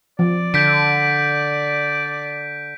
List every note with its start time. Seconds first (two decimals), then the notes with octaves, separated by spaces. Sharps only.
0.19 F3 D5
0.54 D3 G6 B6 D7